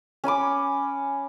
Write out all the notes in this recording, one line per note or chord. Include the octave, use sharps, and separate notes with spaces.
C#4 G#5 B5 D6